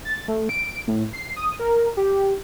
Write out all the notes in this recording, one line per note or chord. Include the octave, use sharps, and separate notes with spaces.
A6
A3
D7
A2
C7
D#6
A#4
G4